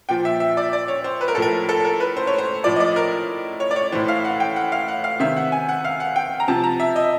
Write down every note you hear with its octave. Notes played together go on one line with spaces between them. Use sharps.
A#2 F3 G5
E5
E5
D5
D5
C#5
C5
B4
A#4
A2 F3 A4
A#4
A4
A#4
B4
C5
C#5
C5
A2 F3 D5
D#5
D5
A#4
C#5
D5
C#5
A2 E3 C5
F5
F#5
G5
F#5
F5
F#5
F5
C3 D#3 E5
F#5
G#5
F#5
F5
F#5
G5
A#5
C3 F3 A5
A#5
E5
D#5